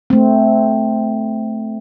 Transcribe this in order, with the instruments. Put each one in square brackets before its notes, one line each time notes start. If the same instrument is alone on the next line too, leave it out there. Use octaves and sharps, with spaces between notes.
[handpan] A3 C4